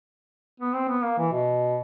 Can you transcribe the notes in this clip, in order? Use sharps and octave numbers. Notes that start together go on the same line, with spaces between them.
B3
C4
B3
A#3
E3
B2